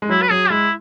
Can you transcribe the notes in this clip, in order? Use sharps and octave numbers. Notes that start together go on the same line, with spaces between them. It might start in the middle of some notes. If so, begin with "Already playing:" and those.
G#3
F#3 E4
B4
F#3 G#4
G#3 E4